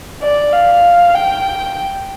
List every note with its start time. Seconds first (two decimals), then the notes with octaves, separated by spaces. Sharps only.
0.22 D5
0.53 F5
1.14 G5